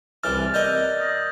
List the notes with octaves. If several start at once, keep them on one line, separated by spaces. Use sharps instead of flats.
C2 E3 D6 F6 F#6 A6
A#4 D5 D#5 E6 G6
D#6 A#6